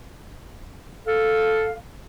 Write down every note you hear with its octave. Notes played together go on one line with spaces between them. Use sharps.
A4 F5